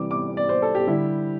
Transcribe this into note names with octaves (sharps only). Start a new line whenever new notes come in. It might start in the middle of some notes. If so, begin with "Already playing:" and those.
Already playing: C3 E3 G3 D6
D6
D5
C5
A4
G4
D3 G3 E4